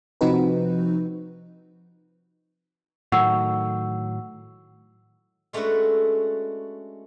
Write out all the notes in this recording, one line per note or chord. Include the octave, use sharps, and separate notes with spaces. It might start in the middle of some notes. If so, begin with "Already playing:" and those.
C3 F3 C4 D#4 F#4 B4
A2 D#3 F#3 F#5 C#6 E6
G#3 A3 C#4 D4 F#4 B4